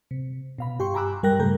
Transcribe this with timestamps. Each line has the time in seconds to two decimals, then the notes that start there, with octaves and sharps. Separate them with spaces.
0.11 C3
0.58 B2 F5 B5
0.79 G2 G4 G5 C6 C#6
0.94 G#5 A#5 B5 D6 E6 F#6
1.23 G2 G3 A#4 G5 F#6 A#6
1.39 G2 C#3 A3 A4 A#5 G6